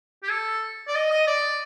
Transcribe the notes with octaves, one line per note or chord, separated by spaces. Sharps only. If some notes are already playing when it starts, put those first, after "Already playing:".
G4
A4
D5
D#5
D#5
D5